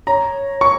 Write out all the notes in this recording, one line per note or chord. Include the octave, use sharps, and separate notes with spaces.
C#5 A#5
C#6